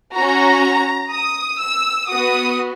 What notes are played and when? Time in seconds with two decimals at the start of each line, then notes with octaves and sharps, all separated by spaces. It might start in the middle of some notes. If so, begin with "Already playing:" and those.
0.14 C#4 F#4 A#5
1.11 D#6
1.59 E6
2.08 B3 F#4 D#6